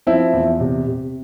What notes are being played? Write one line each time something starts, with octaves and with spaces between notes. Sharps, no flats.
F3 C4 E4
E2
C3
C3